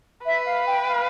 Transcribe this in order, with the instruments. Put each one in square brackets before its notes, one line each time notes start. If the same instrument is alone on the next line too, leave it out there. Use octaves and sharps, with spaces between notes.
[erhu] B4 [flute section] E5
[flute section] F5
G5
F5